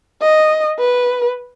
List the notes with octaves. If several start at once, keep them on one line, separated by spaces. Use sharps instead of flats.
D#5
B4